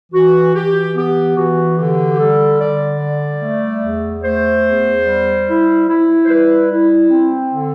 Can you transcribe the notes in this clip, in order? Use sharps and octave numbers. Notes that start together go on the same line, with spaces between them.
E3 F#4
E3 G4
B3 G4
E3 F#4
D3 G4
G4
G3 A4
D3 D5
G3
A3
E2
A3 C5
E2
G3
E4
E4
C5
G3 B4
E4
C4
D3